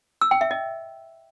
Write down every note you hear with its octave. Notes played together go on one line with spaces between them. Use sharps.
E6
G5
E5
D#5